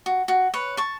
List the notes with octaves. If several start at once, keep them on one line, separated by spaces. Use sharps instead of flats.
F#4
F#4
B4 C#5
A5 C#6